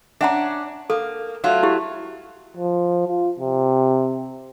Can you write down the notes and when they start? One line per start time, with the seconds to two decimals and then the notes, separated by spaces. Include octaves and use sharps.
0.21 C#4 D4 E5 F#5 A#5
0.90 A#3 A4
1.44 F#3 A3 F4
1.63 E4 G4
2.57 F3
3.08 F4
3.39 C3